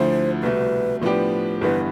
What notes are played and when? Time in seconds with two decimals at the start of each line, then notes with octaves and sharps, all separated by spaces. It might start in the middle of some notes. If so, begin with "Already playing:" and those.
Already playing: D2 D3 F3 A3 E4 C5
0.43 C2 B2 A3 B4
1.02 A2 F3 B3 D4 G4 B4
1.61 G1 G2 E3 B3 B4